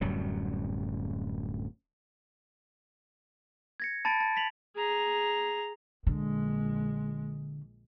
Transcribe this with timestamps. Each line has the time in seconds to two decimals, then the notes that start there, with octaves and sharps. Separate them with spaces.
0.01 D1 F#2 F#3 G3
3.80 G#6 A#6 C#7
4.05 A5 B5 A6 D7
4.20 A5
4.36 A#6 B6 F7 F#7
4.76 G#4 A#5
6.07 A#1 D3 G#3